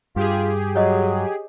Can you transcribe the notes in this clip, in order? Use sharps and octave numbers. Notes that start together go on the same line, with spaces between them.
G2 F4 G4 G#4
F#3 C#5 D#5